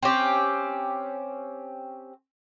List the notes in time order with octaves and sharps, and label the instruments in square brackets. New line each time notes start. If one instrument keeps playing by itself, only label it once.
[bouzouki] C4 C#4 G4